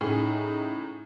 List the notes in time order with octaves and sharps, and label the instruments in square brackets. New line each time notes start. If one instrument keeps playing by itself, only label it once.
[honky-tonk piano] A2 C#3 G#4 [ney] D#4